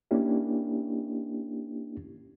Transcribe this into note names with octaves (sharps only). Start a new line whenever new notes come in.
A#3 C#4 D4 E4 G4